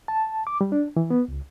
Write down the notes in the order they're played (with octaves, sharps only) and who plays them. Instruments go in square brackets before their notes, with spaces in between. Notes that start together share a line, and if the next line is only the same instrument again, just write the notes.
[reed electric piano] A5
D6
G3
D4
E3
B3
C#2